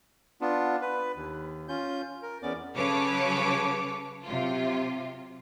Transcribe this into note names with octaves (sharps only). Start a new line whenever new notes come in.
B3 D4 F4
B4
D#2
C#4 F4 G6
A#4
E2 B3 C#4 D5 D6
C#3 F#3 A4 B4 C#5 D6
C3 F#3 F4